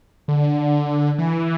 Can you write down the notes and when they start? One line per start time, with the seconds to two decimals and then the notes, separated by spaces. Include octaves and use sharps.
0.28 D3
1.19 E3